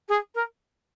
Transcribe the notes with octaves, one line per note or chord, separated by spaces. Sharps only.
G#4
A#4